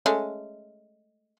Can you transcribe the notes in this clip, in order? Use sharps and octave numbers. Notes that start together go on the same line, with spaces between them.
G#3 A3 C#4